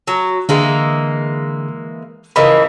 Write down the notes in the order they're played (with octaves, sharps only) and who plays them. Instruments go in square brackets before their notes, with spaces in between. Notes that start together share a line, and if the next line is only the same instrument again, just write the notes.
[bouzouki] F#3
[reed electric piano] D3 G#4 [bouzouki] E3 G#3 A#3
[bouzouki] C#3 E3 F3 [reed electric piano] A#4 D#5 B5